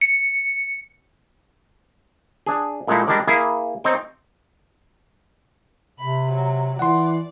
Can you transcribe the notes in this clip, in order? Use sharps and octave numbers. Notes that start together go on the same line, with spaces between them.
C#7
D4 G#4
A#2 G#3 A3 D#4 E4
G3 G#3 D4 A#4 D5
A#3 E4 G#4
C4 D#4 C#5 G5
C3 B5
F#3
E3 D5 F#5 C6